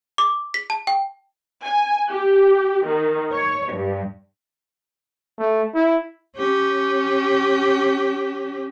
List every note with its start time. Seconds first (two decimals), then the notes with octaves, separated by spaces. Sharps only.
0.18 D6
0.54 B6
0.70 A5
0.87 G5
1.63 G#5
2.10 G4
2.85 D#3
3.32 C#5
3.73 G2
5.38 A3
5.75 E4
6.36 C#4 G4